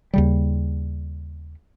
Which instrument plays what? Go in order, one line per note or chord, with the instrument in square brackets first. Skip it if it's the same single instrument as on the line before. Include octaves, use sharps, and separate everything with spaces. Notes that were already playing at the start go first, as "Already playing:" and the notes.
[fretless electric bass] D#2 C#3 G3